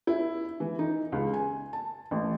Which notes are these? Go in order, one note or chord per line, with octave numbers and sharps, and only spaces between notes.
E4
E3
D#4
C#2
G#5
A5
A1